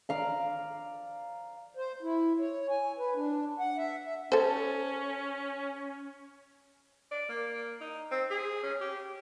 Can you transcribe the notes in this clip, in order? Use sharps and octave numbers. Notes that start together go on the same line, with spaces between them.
D5 F5 A#5
C5
E4
C#5
G#5
B4
D4
F#5
E5
E5
C#4 A4 C5
D5
A#3
D#4
C4
G#4
C#4
G4